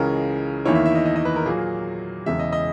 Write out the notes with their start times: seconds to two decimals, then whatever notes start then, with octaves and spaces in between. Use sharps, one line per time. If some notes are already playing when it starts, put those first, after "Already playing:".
Already playing: C#2 C#3 E3 G#3 C#4 A#4
0.65 E2 D#3 A#3 E4 C#5
0.75 E5
0.86 E5
0.95 D#5
1.06 D#5
1.16 D#5
1.25 B4
1.36 A#4
1.46 A#2 F#3 A#3 G#4
2.26 E1 E2 C#3 G#3 E5
2.40 D#5
2.53 D#5